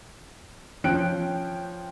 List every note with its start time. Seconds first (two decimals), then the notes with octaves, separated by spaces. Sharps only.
0.84 F3 C#4 G5 F#6 D7